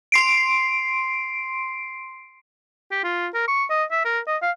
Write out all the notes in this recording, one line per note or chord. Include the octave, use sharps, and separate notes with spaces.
C6 C7 D7
G4
F4
A#4
C#6
D#5
E5
A#4
D#5
F5